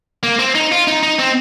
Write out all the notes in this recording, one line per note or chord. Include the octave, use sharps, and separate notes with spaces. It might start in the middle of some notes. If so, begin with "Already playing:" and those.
A#3
C4
D#4
F4
D#4
D#4
C4